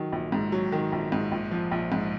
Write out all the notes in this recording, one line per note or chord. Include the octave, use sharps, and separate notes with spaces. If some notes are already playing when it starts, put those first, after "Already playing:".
Already playing: D#3 F#3
A#1
G#2
F#3
D#3
A#1
G#2
A#1
F3
A#1
G#2